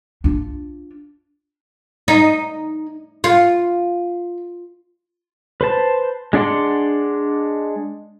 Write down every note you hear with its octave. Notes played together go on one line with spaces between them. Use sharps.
D4 F4
D#4
F4
B4 C5 A5
G#3 D4 D5 F#5 C6